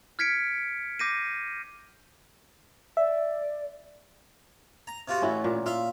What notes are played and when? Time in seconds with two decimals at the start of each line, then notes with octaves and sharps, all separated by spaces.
0.19 F6 G#6 B6 C#7 D7
0.99 D6 G6 A#6 C7 D#7
2.97 D5 E5
4.87 A#5
5.08 C3 F4 F#4
5.22 A1 C#4 E4 F#4
5.44 A#2
5.66 F4 E5 F5